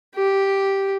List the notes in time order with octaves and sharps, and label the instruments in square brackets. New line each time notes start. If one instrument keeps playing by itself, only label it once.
[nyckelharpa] G4